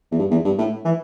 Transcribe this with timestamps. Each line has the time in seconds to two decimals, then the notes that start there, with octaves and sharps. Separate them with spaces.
0.11 E2
0.18 G2
0.31 E2
0.45 G2
0.58 A2
0.85 E3